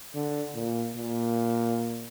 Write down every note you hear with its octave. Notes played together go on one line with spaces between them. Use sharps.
D3
A#2
A#2